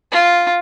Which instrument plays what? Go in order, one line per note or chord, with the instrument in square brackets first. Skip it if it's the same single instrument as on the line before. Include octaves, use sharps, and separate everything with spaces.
[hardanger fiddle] F4